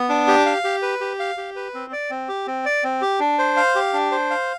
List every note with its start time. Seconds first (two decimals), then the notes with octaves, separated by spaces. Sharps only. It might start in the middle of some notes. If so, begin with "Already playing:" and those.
Already playing: B3
0.09 D4
0.28 G4
0.46 F5
0.64 G4
0.82 B4
1.01 G4
1.19 F5
1.38 G4
1.56 B4
1.74 C4
1.92 D5
2.10 C4
2.28 G4
2.47 C4
2.66 D5
2.84 C4
3.01 G4
3.20 D4
3.38 C5
3.57 F5
3.75 G4
3.93 D4
4.11 C5
4.30 F5